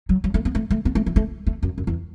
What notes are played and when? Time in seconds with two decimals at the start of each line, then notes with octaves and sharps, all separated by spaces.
0.09 F#3
0.24 F#3
0.34 A3
0.45 B3
0.55 A3
0.70 A3
0.85 B3
0.95 A3
1.06 E3
1.16 A3
1.47 A3
1.63 F#2
1.78 F#2
1.87 E2